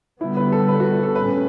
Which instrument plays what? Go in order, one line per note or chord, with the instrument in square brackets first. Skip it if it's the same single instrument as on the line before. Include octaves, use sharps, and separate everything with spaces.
[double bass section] D3 G3 B3 [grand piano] E4
[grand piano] B4
A4
B4
F#4
A4
[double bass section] A2 G3 C#4 [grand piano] B4